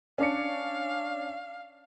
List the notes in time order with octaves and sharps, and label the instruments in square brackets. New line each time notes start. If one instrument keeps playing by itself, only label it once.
[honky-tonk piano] C#4 D4 C#7 [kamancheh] F5